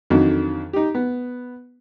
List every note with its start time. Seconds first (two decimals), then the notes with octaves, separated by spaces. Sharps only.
0.10 F2 D3 D#3 F#3
0.73 D#4 G4
0.95 B3